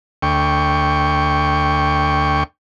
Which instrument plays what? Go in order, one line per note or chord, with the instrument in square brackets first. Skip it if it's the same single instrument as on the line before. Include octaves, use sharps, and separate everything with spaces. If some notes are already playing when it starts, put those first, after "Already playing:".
[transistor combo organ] D2 G5 C#6